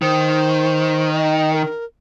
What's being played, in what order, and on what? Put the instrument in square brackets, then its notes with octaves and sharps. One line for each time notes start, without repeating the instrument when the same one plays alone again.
[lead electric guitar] D#3 [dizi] C5
[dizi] D#5
A#4